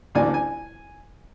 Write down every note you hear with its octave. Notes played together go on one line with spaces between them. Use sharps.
A1 D2 A#3 D4 D5 G#5
G#5